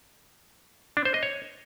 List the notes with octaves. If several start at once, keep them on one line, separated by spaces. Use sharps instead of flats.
D4
C5
D#5
C#5